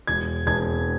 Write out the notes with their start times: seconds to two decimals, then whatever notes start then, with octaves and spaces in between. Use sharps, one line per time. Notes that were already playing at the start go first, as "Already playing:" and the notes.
0.07 E1 G#6
0.47 E1 G#6